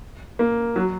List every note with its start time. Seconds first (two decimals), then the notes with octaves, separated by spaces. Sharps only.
0.39 A#3
0.76 F#3